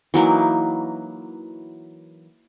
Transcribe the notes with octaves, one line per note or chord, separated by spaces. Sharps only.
E3 F#3 A#3 D#4